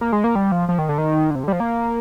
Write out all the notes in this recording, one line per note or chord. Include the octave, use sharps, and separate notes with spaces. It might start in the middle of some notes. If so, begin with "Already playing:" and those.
A#3
G#3
A#3
G3
F3
F3
D#3
D3
D#3
D3
C3
D3
G3
F3
A#3